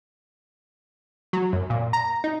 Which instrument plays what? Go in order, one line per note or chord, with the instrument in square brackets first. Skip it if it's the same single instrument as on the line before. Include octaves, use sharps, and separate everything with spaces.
[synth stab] F#3
F#2
A#2
A#5
D#4